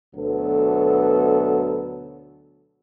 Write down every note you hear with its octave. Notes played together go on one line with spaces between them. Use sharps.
D2 B2 F#3 B3 A4